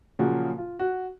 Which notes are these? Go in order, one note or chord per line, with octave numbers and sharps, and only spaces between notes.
A#2 C#3 F3 F#3 F#4
F4
F#4